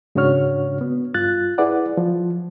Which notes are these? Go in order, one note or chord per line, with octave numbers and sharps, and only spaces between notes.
G#2 C#3 D4 F#4 C#5 F6
B3
G2 F4 F#6 A6
E4 G#4 B4 D5 F#5
F3